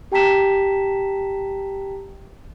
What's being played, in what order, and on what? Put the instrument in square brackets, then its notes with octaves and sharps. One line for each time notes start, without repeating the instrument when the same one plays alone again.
[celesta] G4 G5 A5 A#5 B6 E7